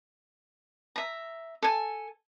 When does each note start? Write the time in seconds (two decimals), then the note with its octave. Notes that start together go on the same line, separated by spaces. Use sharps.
0.96 E5 A#5
1.62 A4 G#5